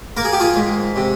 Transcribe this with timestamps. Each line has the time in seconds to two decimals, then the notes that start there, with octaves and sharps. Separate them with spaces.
0.17 A#3 A#4
0.25 G#4
0.33 G4
0.40 F4 G#4
0.56 G#2
0.96 C3